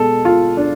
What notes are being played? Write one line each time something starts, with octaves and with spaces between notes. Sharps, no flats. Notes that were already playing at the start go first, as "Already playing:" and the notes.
Already playing: B2 G#3 A4
F4
D4